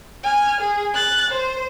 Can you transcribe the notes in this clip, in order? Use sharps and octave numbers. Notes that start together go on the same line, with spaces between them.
G#5 F6
G#4
F#6 A6
C5